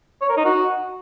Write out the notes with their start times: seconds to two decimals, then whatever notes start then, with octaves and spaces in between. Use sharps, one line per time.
0.21 C#5
0.29 A#4
0.37 D#4
0.45 F#4